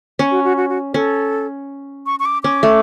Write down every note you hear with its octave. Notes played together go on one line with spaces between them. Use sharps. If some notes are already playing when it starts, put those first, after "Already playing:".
C#4
F#4
F#4
F#4
F#4
C#4 A4
C#6
C#6
D6
C#4 D6
A3